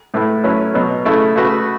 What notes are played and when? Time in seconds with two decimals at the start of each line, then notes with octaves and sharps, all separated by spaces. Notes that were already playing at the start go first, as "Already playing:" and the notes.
0.14 A2 A3 E4 B4
0.44 F#3 A3 C#4 E4 B4
0.74 B2 F#3 B3
1.05 C#3 A3 E4 A4
1.36 C#3 A3 F#4 B4